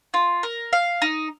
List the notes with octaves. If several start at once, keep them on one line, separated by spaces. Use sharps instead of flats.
F4
A#4
F5
D#4